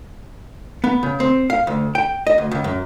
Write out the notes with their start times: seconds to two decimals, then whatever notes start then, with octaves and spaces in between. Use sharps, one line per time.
0.84 B3
1.03 C#3
1.20 C4
1.50 F5
1.67 D2
1.95 G5
2.27 D#5
2.38 D2
2.51 C#2
2.64 F#2